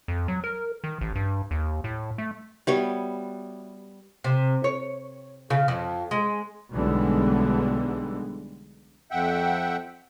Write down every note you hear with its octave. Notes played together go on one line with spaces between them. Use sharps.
F2
F#3
A#4
D#3
A1
G2
D#2
A2
A3
G3 B3 F#4 G4 C#5 E5
C3
C#5
C#3
F2
G#3
B1 D3 E3 G3 G#3 B3
F2 E5 F#5 G5